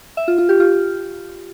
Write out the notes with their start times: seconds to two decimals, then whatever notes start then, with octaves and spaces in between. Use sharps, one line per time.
0.17 E5
0.28 F4
0.38 F4
0.49 G4
0.60 F4